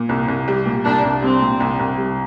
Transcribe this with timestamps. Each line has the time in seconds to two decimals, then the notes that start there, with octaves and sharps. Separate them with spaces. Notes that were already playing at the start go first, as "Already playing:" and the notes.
Already playing: A#2
0.09 C2
0.28 C2
0.48 G3
0.66 A#2
0.85 C2 D4
1.03 C2
1.22 G3 C4
1.41 A#2
1.60 C2
1.79 C2
1.98 G3